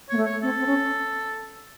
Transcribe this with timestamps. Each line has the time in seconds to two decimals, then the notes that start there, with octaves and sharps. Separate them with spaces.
0.09 A#3 C#5
0.17 A3
0.26 C#5
0.42 C4 A4
0.59 C4
0.67 C#4